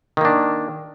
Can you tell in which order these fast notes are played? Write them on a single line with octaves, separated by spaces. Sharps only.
D#3 A#3 D4